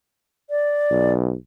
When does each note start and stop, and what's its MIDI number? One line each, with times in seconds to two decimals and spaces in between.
0.50 1.13 74
0.91 1.35 35